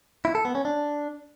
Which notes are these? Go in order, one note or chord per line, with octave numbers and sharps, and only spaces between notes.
E4
A4
B3
C#4
D4